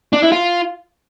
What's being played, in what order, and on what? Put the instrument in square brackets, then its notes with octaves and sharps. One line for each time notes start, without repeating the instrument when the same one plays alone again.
[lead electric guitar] D4
E4
F4